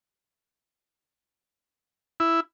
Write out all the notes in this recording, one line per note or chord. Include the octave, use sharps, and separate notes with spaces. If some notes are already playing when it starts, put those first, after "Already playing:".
E4